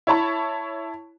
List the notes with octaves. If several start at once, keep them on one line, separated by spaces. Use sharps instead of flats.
E4 C#5 A5 B5